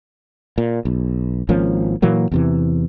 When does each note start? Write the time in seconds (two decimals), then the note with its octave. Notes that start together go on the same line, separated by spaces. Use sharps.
0.58 A#2
0.85 B1
1.49 G#1 F3 A#3 C#4
2.02 A#2 E3 F#3 A#3
2.31 E2 C3 E3